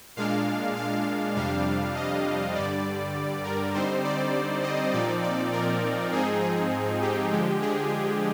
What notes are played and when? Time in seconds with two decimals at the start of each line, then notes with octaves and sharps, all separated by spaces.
0.17 A#2 G#3 D4 F5
0.76 F5
1.36 F2 C3 G3 D4 F5
1.95 D#5
2.55 G2 D3 G3 D5
3.44 A#4
3.74 D3 G3 C4 D#4 C5
4.04 D5
4.63 D#5
4.93 A#2 F3 C4 D#4 D5
5.23 D5
5.53 A#4
6.12 G#2 F3 C4 D#4 G#4
6.42 G#4
7.02 G4
7.32 D3 F3 G#3
7.62 G#4